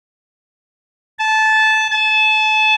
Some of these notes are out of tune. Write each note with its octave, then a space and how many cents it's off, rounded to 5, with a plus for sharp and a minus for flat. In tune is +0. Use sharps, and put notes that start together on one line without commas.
A5 -15
A5 -30